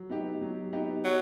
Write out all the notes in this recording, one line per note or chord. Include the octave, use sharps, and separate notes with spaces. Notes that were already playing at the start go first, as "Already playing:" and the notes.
Already playing: F#3
B3 D#4 G4
F#3
B3 D#4 G4
F#3